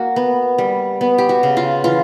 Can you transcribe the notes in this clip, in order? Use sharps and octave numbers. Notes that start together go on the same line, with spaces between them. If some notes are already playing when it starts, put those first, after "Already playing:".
Already playing: A#3 F#4
B3
G3
B3
G4
F#4
C#3
F4
E3 F4